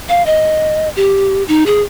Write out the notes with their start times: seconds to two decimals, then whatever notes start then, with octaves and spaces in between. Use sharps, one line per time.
0.09 F5
0.26 D#5
0.96 G4
1.48 D#4
1.66 G#4